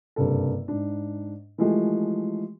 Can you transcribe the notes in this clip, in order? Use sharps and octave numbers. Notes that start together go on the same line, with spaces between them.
F#1 G2 C3 A4
G#2 D4
E3 F3 G#3 A3 G4